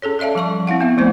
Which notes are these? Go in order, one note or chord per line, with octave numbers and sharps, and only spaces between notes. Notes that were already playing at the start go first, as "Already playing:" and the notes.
C#4 G#4 A4 C#5
A4 D5 E5 F5 A5
F3 G3 A5 C#6
C4 E4 F5 F#5
B3 E5
F3 A3 A#3 E4 C5